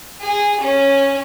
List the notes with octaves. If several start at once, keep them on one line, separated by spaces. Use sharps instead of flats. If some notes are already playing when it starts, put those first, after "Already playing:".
G#4
C#4